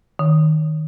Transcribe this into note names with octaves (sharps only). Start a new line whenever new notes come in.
D#3